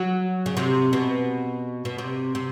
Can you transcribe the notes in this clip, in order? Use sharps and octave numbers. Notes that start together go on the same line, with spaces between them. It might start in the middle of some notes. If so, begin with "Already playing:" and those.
Already playing: F#3
C#3
C3
B2
B2
C3
C3